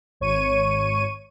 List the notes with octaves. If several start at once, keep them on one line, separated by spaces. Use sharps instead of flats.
G#1 C#5 C#6 D#7